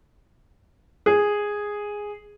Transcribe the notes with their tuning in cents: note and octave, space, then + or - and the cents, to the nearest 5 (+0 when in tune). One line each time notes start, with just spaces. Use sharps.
G#4 -5